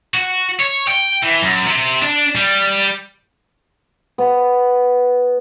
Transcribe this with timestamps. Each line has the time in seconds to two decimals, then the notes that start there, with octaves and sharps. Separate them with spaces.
0.14 F#4
0.60 C#5
0.88 G5
1.23 E3
1.42 F#2
1.66 C3
2.02 D4
2.35 G3
4.18 B3